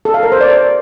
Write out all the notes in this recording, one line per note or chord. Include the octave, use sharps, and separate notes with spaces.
A4
F5
A#4
C5
D5